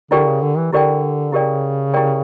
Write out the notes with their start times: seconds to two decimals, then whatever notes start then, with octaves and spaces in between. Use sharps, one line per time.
0.11 D3 E4 G4 A#4 D5 G5
0.27 C#3
0.41 D3
0.57 E3
0.72 D3 E4 G4 A#4 D5 G5
1.32 C#3 E4 G4 A#4 D5 G5
1.94 E4 G4 A#4 D5 G5